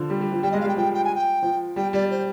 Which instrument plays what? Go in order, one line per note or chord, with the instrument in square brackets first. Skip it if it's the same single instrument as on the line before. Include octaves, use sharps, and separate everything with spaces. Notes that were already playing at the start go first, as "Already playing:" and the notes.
Already playing: [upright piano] D3 F3
G3
G3
F3
[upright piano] G3 [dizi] G5
[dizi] D#5
[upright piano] G#3
[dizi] F5
[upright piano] G3 [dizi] G5
[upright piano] F3 [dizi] G5
[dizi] G5
G#5
G5
[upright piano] F3
[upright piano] G3 [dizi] G5
[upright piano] G3 [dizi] D5
[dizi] C5